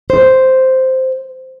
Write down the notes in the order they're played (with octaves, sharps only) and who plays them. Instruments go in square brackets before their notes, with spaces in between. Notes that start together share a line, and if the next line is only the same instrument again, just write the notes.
[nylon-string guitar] C5